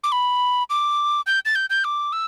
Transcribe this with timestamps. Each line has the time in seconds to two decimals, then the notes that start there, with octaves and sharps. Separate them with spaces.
0.04 D6
0.12 B5
0.70 D6
1.27 G6
1.45 A6
1.55 G6
1.70 G6
1.84 D6
2.12 E6